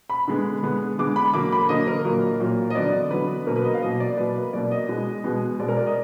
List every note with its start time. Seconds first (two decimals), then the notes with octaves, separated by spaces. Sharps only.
0.10 B5
0.28 D3 G#3 B3
0.63 D3 G#3 B3
0.99 D3 G#3 B3 D6
1.16 B5
1.34 D3 F#3 A#3 D6
1.52 B5
1.69 D3 F#3 A#3 D#5
1.88 A#4
2.05 A#2 F#3 A#3
2.40 A#2 F#3 A#3
2.70 D#5
2.75 D3 F#3 B3 D5
3.11 D3 F#3 B3 B4
3.47 B2 F#3 A#3 A#4
3.56 B4
3.64 D#5
3.74 F5
3.82 B2 F#3 A#3 D#5
4.00 D5
4.17 B2 F#3 A#3 B4
4.35 B4
4.53 B2 F#3 A#3 D5
4.71 D#5
4.88 B2 G#3 B3
5.24 B2 G#3 B3
5.59 B2 G#3 B3 D5
5.68 A#4
5.77 D5
5.86 D#5